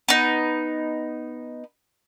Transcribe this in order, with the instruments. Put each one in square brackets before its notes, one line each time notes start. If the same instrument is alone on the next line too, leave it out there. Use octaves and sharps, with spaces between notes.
[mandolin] B3 D#4